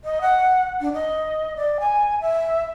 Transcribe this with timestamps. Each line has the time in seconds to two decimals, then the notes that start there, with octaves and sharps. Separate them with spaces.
0.04 D#5
0.21 F#5
0.81 D4
0.93 D#5
1.57 D5
1.80 G#5
2.21 E5